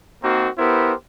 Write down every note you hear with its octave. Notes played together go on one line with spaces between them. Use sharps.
A#3 C4 D#4 F#4 A#4
B3 E4 G4 A#4 C5